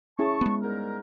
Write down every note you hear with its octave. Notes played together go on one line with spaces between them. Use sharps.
C#4 E4 G#4 A5 C#6
G#3 B3
G#2 G3 A#4